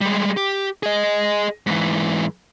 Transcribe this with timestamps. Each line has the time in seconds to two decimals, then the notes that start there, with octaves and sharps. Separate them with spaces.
0.01 G3 G#3
0.37 G4
0.83 G#4 D#5
1.67 G#2 E3